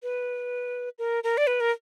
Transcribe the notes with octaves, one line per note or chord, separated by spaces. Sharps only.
B4
A#4
A#4
D5
B4
A#4